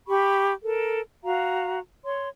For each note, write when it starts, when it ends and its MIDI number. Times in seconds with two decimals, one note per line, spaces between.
0.07 0.52 67
0.07 0.52 83
0.07 0.52 85
0.63 1.01 69
0.63 1.01 70
1.24 1.79 66
1.24 1.79 77
1.24 1.79 82
2.04 2.29 73
2.04 2.29 84